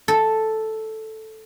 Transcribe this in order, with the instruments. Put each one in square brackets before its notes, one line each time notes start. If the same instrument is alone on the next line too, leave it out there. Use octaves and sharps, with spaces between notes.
[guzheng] A4